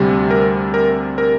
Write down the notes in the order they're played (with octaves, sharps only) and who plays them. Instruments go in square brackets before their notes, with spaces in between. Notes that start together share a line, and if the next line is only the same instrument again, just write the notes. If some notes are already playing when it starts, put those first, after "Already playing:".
Already playing: [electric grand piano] D2 C3 G3
A#4
A#4
A#4